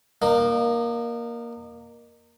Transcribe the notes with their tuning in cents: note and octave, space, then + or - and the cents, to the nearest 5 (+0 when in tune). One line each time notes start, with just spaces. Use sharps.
A#3 +10 D#4 -30